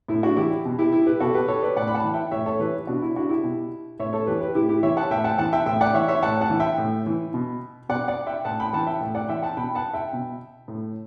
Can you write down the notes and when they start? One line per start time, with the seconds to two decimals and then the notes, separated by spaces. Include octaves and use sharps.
0.08 A2 E4
0.23 D4 F#4
0.37 E3 E4 G4
0.65 B2
0.79 E4 G4
0.92 E4
1.06 G4 B4
1.20 B2 F#4 A4
1.34 G4 B4
1.48 A4 C#5
1.62 B4 D5
1.76 A2 D5 F#5
1.87 B5
1.94 F#5 A5
2.04 E3
2.14 E5 G5
2.32 A2 C#5 E5
2.46 A4 C#5
2.59 E3 G4 B4
2.87 B2 D4 F#4
3.02 E4
3.16 D4 F#4
3.29 E4 G4
3.44 B2
4.00 A2 C#5 E5
4.13 A4 C#5
4.27 E3 G4 B4
4.41 G4 B4
4.55 A2 E4 G4
4.69 E4 G4
4.83 E3 C#5 E5
4.97 F#5 A5
5.11 A2 E5 G5
5.24 F#5 A5
5.38 E3 F#5 A5
5.53 E5 G5
5.66 A2 E5 G5
5.81 D5 F#5
5.94 E3 C#5 E5
6.08 C#5 E5
6.22 A2 F#5 A5
6.41 F#5 A5
6.50 E3
6.60 E5 G5
6.78 A2
7.06 E3
7.34 B2
7.89 B2 D5 F#5
8.08 D5 F#5
8.27 E5 G5
8.45 A2 F#5 A5
8.60 G5 B5
8.73 E3 F#5 A5
8.87 E5 G5
9.01 A2
9.15 D5 F#5
9.29 E3 E5 G5
9.42 F#5 A5
9.57 B2 G5 B5
9.75 F#5 A5
9.94 E5 G5
10.13 B2
10.68 A2